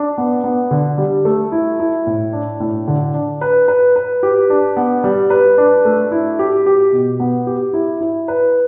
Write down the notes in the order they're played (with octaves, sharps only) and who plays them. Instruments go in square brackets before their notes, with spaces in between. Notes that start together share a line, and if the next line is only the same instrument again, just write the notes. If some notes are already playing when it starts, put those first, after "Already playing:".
Already playing: [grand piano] D4
B3
B3
D3
G3
A3
E4
E4
A2
D4
A2
D3
D4
B4
B4
B4
G4
D4
B3
G3
B4
D4
A3
E4
G4
G4
B2
B3
G4
E4
E4
B4